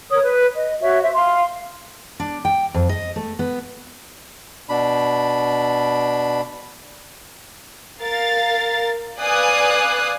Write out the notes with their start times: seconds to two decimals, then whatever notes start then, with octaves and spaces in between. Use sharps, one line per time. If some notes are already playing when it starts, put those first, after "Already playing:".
0.10 A#4 C#5 D#6
0.22 B4
0.54 D#5
0.81 F#4 C#5 E5
1.01 C5 E5
1.14 F5 C6
2.20 D4
2.45 G5
2.74 F2
2.89 D#5
3.16 A3
3.39 B3
4.69 B2 D4 B5
8.02 A#4 F5 A6
9.20 B4 D5 F5 G#5 D#6 F#6